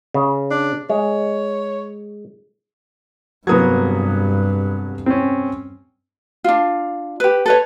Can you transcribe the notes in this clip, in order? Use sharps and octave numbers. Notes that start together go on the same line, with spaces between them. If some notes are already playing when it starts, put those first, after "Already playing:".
C#3
D4
G#3 C#5
F1 G2 F#3 A#3 B3 D#6 G#6
C4 C#4
D4 F4
G4 B4
A4 B4 C#5